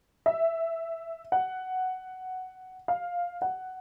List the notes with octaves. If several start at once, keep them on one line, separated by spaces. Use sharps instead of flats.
E5
F#5
F5
F#5